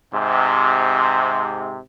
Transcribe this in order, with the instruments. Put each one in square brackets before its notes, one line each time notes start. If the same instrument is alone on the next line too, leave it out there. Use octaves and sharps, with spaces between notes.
[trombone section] G#2 C3